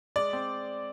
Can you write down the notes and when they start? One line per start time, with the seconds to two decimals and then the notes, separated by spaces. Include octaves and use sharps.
0.16 G#3 D5
0.33 C4